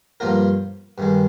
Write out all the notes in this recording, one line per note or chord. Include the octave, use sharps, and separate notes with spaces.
G2 F3 A#3 F4 A#4
G2 D#3 G#3